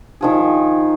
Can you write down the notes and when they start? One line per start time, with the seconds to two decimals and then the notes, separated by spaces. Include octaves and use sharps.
0.21 D#3 F3 G#4